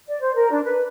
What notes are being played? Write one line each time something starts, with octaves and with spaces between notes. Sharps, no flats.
D5
C5
A#4
D4
B4